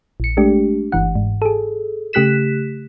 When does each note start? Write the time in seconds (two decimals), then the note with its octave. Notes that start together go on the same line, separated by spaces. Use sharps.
0.20 A#1 C#7
0.37 G#3 A3 D4 G4
0.92 G1 E3 F#5
1.15 G#2
1.42 G#4 A4
2.13 C#3 A3 G4 F#6 B6 E7